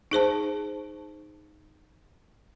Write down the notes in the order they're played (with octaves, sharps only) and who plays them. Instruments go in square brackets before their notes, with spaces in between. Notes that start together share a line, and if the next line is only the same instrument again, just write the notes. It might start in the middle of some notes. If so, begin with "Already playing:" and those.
[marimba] D#4 G#4 C5 A5